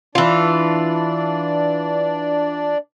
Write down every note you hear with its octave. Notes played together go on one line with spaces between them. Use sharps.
E3 D4 F4 D5